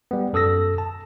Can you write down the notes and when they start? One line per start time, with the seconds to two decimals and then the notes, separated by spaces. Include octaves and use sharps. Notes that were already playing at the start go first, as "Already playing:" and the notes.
0.11 G3 B3
0.33 F#2 A4 D#6 E6 A#6
0.78 A5